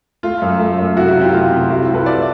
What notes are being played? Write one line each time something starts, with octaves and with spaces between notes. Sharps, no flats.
A3 F4
F#2
A3
F#2
C3 E4 F#4
E4 F#4
C3
F4 G4
A3 F4
C3
G3 E4 F#4
F4
C2
A4 B4
G3 D5 E5